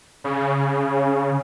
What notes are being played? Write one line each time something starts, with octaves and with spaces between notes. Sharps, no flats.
C#3